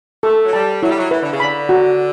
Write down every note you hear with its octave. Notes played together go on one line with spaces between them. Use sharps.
A3 A4
F#3
G3 A5
F#3 E4
G3
F#3
E3 B4
D3
C#3
D3 B5
F#4